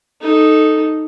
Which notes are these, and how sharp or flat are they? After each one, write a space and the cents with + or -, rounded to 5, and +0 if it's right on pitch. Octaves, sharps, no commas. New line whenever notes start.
D#4 +0 A4 +0